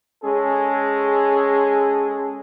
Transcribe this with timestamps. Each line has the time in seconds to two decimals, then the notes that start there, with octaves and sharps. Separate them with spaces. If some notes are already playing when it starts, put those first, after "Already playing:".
0.24 G#3 C#4 G#4 A4